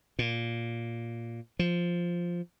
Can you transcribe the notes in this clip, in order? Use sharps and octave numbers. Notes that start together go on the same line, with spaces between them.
A#2
F3